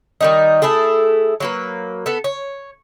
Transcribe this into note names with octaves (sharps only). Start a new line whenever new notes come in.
D#3 G3 D#4
A3 E4 G#4 A4
F#3 A#3 B4
B3 A4
C#5